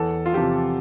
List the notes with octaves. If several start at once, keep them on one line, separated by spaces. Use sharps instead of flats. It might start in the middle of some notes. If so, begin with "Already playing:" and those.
Already playing: E2 A4
F4
C3 F3 G4